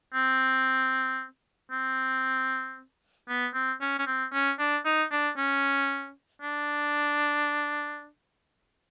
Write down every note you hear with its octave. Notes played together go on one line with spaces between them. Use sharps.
C4
C4
B3
C4
C#4
C#4
C4
C#4
D4
D#4
D4
C#4
D4